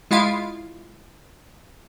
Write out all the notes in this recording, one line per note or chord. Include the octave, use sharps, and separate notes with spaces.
G#3 E4 F4 F5